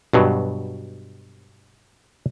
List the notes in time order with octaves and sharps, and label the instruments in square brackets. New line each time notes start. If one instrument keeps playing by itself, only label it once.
[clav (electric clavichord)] G2 B2 F#3